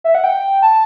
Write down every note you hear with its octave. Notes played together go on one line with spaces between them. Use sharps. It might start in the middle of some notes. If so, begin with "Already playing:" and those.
E5
F#5
G5
A5